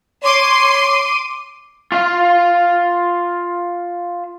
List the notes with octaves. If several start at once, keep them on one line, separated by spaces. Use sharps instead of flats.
C#5 C6 D6 D#7
F4 F5